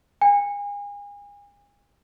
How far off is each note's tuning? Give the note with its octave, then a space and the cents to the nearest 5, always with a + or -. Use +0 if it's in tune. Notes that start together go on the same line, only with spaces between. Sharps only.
G#5 -35